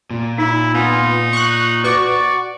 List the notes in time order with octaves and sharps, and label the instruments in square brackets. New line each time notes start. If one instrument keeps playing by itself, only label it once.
[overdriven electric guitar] A#2
[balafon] D#4 [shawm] E4
[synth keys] B3 F4 [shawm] D#4 [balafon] G#5
[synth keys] C#6 F#6
[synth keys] F#4 C#6 [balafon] B4 D6 [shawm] D5